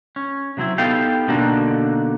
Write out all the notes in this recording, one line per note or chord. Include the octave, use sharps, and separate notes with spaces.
C#4
C3 F#3 C4 E4
B3 D#4 G4 A4 F5 G5
B2 D3 A#3 D4 D#4 F#4